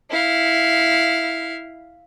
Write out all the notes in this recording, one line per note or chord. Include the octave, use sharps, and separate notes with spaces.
E4 F5